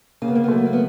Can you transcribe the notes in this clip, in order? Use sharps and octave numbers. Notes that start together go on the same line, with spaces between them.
C#3 A#3
B3
A#3
B3
F#3 A3 A#3
B3
A#3
B3